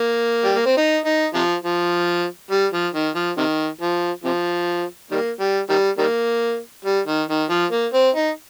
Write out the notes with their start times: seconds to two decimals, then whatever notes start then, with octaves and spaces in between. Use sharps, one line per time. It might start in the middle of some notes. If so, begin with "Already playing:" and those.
Already playing: A#3
0.44 G3
0.55 A#3
0.66 C4
0.77 D#4
1.06 D#4
1.35 C3 F3
1.64 F3
2.51 G3
2.72 F3
2.94 D#3
3.15 F3
3.37 C3 D#3
3.81 F3
4.24 C3 F3
5.11 D#3 G3 A#3
5.40 G3
5.69 D#3 G3
5.98 D#3 G3 A#3
6.85 G3
7.07 D#3
7.29 D#3
7.50 F3
7.72 A#3
7.93 C4
8.15 D#4